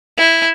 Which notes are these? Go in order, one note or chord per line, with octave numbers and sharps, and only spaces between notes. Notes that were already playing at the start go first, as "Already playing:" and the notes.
E4